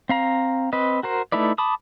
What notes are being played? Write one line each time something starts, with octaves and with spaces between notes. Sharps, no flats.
C4 F5 A#5
C4 B4 D#5
F#4 A#4 C5
A3 D#4 E4 B4 D5
A5 B5 D6 D#6